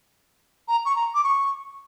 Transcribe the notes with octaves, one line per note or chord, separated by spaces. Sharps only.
A#5
C#6
A#5
D6
C#6